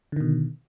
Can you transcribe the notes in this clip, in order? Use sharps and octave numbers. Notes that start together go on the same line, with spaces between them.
B2 D3 D#3